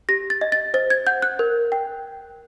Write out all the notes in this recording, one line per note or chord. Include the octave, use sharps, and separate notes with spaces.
G4 A#6
A6
D#5
A6
C5 A6
G#6
F#5 G6
F#6
A#4
G5